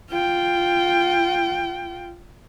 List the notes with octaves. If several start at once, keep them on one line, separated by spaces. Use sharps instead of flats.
F4 G5